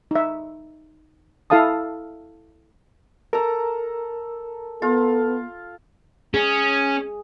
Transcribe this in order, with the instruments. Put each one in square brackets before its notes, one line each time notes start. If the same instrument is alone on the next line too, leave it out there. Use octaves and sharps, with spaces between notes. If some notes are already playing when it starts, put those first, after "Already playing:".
[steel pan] D#4 E5
E4 A4 F5 A5 D#6
[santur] A4 A#5 [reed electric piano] A#4
[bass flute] B3 [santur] F4 [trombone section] A4
[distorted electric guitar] C#4 [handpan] G#4